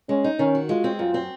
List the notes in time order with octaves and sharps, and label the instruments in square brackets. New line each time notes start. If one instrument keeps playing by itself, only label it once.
[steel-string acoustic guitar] G#3 [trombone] C#4
[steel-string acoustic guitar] D#4
[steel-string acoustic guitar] D#3 [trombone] C#4
[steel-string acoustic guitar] F#4
[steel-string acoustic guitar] G#3 [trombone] F4
[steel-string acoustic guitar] C4
[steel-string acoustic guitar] F#2 [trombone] F4
[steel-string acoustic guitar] C4